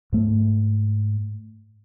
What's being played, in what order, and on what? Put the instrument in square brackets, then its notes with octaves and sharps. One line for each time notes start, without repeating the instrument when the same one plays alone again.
[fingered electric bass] G#2 A3